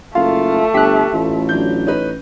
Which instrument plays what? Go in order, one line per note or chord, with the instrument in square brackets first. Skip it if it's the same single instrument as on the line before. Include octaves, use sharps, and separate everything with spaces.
[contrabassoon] F#1 [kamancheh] A3 [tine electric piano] F4 [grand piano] F5
[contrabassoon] G1 [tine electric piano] G4 F#6 [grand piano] B6
[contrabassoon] A1 [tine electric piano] F4
[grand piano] F#3 D4 G6
C#4 D#4 B4